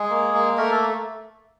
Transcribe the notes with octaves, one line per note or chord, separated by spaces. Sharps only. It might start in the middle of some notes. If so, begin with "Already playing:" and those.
Already playing: G#3 G#4
A#3
A#3
A3 A#4
A4